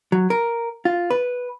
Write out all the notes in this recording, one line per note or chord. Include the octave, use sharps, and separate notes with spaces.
F#3
A#4
F4
B4